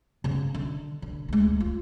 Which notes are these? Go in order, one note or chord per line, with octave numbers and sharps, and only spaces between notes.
C#3 B3
D3
D3
D2 G#3
F4